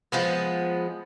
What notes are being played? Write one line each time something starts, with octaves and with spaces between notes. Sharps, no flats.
F3 G#3 B3